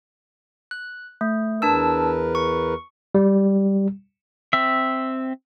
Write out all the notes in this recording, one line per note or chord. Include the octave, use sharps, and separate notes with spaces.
F#6
A3
E2 D4 A#4 B4 A5 E6
C#6
G3
C4 E5